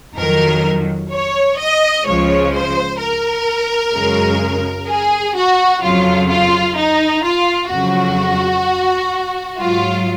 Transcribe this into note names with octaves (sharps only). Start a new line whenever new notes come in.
F2 D#3 F#3 A#4
C#5
D#5
C#2 C#3 F3 G#3 C#5
C5
A#4
F#2 C#3 G#3
G#4
F#4
F2 C#3 F#3 F4
F4
D#4
F4
F2 C#3 F#3 F#4
G#2 F#3 F4